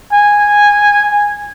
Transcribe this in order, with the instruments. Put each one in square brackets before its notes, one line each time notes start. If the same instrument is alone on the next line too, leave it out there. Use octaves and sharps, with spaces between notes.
[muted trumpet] G#5